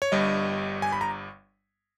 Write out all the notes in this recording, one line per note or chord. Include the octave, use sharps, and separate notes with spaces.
C#5
G1 G2 G3 D#5
G#5
B5
A#5